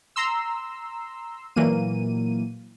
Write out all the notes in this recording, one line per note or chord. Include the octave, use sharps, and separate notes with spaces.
A#5 C6 E6
A#2 E3 F#3 A#3 D#7